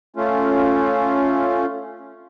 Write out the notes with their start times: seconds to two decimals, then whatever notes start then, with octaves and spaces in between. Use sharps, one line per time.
0.16 A3 C#4 F4